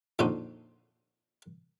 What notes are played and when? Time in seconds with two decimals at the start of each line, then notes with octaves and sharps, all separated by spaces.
0.19 F2 A#2 D3 F3 D#4 F#4